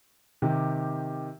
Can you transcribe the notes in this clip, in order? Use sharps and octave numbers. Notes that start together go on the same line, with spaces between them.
C3 D#3 G4